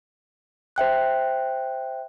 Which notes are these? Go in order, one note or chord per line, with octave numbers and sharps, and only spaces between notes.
C5 E5 G5 F#6